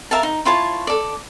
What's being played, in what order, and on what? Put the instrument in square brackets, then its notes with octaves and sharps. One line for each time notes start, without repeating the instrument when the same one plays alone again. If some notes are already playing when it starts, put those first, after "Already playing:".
[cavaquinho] A#4 E5 F5 A5
D#4
E4 F4 C#5 A5
A4 D5